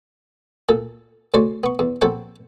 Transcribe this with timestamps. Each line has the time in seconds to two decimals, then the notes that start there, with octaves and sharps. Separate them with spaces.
0.69 A#2 A4
1.34 D2 C#3 C5 D5 C#6
1.64 B3 C#6
1.79 E2
2.01 A#1 C4 A4 F#5 G5 C#6